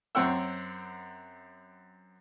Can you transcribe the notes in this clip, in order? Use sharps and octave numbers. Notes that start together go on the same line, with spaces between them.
F#2 C4 C#5 F#5 G5 E6